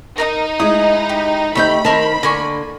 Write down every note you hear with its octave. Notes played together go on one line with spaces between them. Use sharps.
D#4 A#4 B4 D#5
G#3 E4 D#6
G4
D2 A3 C4 D#4 G4 B5 G6
D#3 C4 A#4 A5
D3 A#3 G#5 C#6